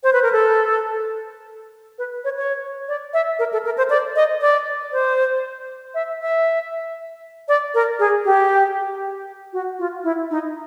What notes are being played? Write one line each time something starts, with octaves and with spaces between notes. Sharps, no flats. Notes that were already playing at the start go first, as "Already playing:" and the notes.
C5
B4
A#4
A4
B4
C#5
C#5
D5
E5
A#4
A4
A#4
C5
D5
D#5
D5
C5
E5
E5
D5
A#4
G#4
G4
F#4
F4
E4
D#4